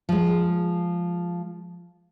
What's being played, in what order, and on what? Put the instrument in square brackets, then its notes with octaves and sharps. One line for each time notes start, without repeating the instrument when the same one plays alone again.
[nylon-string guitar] F3 G#3